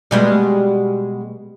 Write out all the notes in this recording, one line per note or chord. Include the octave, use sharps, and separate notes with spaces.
B2 G3 G#3